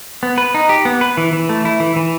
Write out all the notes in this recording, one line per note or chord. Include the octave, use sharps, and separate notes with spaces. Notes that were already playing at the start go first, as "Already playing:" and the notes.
B3
B4
D#4
G4
B3
B4
E3
E3
A3
E4
E3
E3